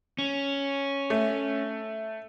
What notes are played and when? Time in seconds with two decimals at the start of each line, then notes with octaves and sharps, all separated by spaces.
0.18 C#4
1.10 A3